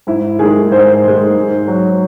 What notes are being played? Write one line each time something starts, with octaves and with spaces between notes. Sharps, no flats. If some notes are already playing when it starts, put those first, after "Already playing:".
G#2 E4
D#3 G#3 G#4
G#2 C5
D#3 G#3
G#2
F#3